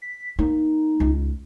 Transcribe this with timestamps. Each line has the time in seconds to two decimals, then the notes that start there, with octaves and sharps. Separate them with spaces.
0.02 B6
0.39 A#3 D#4
1.00 C#2